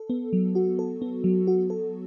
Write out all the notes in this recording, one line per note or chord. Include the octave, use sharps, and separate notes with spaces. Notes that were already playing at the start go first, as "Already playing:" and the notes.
Already playing: A4
B3
F#3
F#4
A4
B3
F#3
F#4
A4